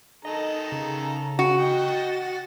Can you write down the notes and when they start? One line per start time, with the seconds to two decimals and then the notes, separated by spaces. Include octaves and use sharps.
0.25 D#3 A4 D#5 A#5
0.72 C#3
1.39 F#4
1.57 D#5 G5
1.88 A6